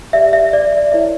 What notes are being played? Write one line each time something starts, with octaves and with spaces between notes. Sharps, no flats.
G4 D5 E5
E5
D5
D5
E4 A#4 C#5 E5